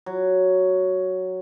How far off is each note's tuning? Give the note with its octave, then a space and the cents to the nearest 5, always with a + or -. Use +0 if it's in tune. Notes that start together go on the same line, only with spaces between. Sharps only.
F#3 +5